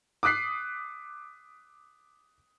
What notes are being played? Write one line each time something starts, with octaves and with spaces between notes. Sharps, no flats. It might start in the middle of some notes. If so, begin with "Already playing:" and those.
D6 D#6 F#6 B6 C7